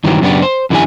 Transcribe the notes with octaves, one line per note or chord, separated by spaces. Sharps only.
G2 D#3 E3 F#3 G4
F#2 C#3 B3 C4 D4 G4
C5
F#2 D3 E3 E4 G4 G#5